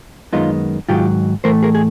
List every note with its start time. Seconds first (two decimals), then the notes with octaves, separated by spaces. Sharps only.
0.33 F#2 D#3 G#3 B3 D#4 F4
0.89 G#2 D#3 F#3 F4 G4
1.44 A2 E3 A3 A#4 C5
1.63 G#4 A#4
1.75 G#4